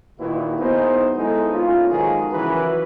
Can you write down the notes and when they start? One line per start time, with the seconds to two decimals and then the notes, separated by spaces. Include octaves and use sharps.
0.20 D#2 A#2 D#3 E4 F#4 B4
0.59 B1 B3 D#4 E4 G#4 C5
1.17 G#3 B3 D#4 E4 G#4 A4
1.53 B1 A#3 C#4 F4
1.90 D#3 F3 G#3 F#4 G#4 A#4
2.31 C#3 E3 F#3 E4 F#4 B4